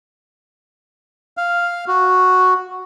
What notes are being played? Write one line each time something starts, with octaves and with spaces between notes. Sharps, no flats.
F5
F#4